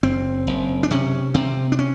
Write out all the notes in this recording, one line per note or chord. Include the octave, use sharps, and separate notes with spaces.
F#1 C4
F#1
D4
C3 C#4
C3 C4
D4
C#4